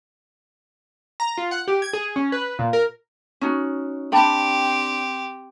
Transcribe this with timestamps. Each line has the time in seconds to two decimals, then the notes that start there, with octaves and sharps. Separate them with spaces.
1.20 A#5
1.38 F4
1.51 F#5
1.68 G4
1.82 G#6
1.93 G#4
2.16 C#4
2.32 B4
2.59 A#2
2.73 A#4
3.41 C#4 D#4 F#4
4.12 C4 D4 G4 G5 B5